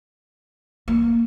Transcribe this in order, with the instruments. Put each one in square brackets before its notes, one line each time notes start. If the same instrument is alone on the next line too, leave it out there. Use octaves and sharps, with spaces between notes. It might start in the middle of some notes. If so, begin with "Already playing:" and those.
[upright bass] A#3